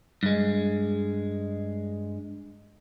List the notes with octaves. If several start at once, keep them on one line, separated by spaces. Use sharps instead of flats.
G2 G#3